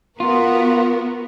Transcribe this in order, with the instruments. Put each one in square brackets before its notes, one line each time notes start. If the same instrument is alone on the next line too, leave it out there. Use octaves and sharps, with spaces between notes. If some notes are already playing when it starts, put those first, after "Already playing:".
[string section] B3 F#4 A#4 [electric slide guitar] F4